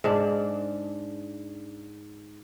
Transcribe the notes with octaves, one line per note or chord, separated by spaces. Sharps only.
G#2 D4